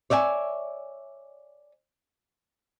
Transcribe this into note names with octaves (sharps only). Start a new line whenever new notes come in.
C#5 D5 E5 F#5 G#5